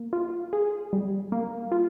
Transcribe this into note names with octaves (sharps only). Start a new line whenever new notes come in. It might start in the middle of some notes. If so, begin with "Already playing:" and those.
Already playing: A#3
F4
G#4
G3
A#3
F4